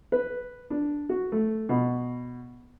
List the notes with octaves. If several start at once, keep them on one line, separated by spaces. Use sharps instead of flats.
B4
D4
F#4
A3
B2